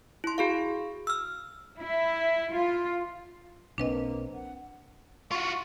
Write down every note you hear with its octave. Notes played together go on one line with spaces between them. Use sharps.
E4 C6
F#4 G#4 F5
E6 F6
E4
F4
B1 A#3 C4 D4 B4 D#5
F#5
F4 F#4 C#6